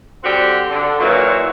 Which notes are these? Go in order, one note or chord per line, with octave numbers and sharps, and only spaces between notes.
D3 G3 C4 F#4 G4
D3
A#2 E3 F#3